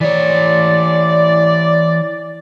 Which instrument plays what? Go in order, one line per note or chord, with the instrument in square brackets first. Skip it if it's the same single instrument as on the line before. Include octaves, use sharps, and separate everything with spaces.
[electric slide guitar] E3 C#5 [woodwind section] D5